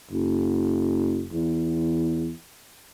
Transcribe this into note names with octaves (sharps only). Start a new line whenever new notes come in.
F#1
E2